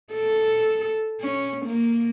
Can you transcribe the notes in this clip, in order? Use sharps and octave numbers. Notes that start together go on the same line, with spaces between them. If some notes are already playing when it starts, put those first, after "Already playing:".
A4
C#4
A#3